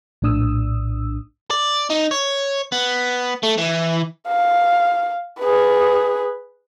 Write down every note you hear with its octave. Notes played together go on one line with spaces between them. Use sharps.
A#1 A2 D4 D#6 E6
D5
D#4
C#5
B3
A3
E3
F5
G#4 B4